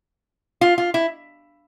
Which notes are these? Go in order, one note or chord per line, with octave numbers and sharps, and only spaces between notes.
F4
F4
E4